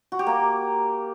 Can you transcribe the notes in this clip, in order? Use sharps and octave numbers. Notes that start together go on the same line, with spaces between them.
F#4
G4
A#3